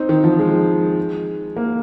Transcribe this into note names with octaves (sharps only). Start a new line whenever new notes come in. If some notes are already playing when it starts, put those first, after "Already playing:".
Already playing: C4 D#4
D#3
F3
G#3
A#3